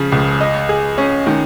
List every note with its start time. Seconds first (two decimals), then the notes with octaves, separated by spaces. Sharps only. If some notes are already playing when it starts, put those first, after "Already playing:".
Already playing: C#3 F3 C#4
0.12 C#2
0.41 D#5
0.69 G#4
0.98 C#4
1.27 D#3